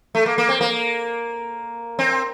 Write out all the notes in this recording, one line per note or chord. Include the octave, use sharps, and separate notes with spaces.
A3
A#3
A#3
C4
A#3
C4